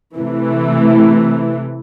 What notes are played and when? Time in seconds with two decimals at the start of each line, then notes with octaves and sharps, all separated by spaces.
0.17 C3 E3 A3